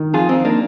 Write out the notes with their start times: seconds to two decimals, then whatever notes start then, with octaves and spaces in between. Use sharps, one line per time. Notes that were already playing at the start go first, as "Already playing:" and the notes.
Already playing: D#3
0.14 F2 F4 G#4
0.29 C4 D#4
0.45 A#3 D4